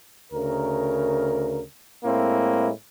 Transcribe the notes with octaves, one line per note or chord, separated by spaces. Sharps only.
D2 C#3 A#4
A2 G#3 A#3 C4 E4